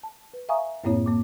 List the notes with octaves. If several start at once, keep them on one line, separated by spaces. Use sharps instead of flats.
A5
B4
E5 F5 G#5 A#5 C#6 D#6
F#2 A2 A#3 C4 E4 C#5
A#3 D6